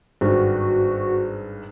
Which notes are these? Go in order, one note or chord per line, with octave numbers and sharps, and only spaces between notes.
G#1 G2 F#4